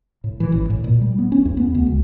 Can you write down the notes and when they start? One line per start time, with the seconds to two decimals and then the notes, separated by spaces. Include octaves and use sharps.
0.24 A2
0.40 E3
0.52 A1
0.70 A2
0.84 A#2
1.01 G3
1.18 B3
1.32 C#4
1.45 E2
1.57 B3
1.75 D2
1.86 C#2